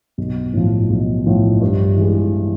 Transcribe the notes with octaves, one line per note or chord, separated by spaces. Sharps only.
B1
A2 F3
B1
A2 F3
G2
E3 G#3